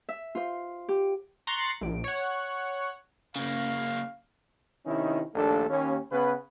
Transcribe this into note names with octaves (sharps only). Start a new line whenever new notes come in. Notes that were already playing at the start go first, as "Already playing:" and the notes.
E5
F4 C5
G4
A#5 C6 C#6 F#6 A6 C7
A#1 D7
C#5 F#5
C#3 A#3 F5
C3 D#3 C#4 D#4 E4
A#1 D#2 A3 D4 A4
D#2 C#4
C#3 B3 C#4 B4